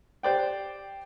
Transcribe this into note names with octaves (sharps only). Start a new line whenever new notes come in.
G4 C5 D5 G5